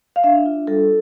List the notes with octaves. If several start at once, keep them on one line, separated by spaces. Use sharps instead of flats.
F5
D4 E5
F4
G3 A4